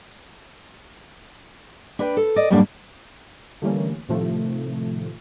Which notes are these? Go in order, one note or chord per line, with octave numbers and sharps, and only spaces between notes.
D4 B4 G5
A4
D5 D#5
F#2 A2 G3 A#3 D4
D3 E3 G3 A3 A#3 C#4
A2 C3 D#3 F3 A3